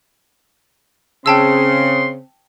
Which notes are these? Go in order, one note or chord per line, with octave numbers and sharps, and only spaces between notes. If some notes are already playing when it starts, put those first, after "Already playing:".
C#3 C4 G5 A5 C6 E6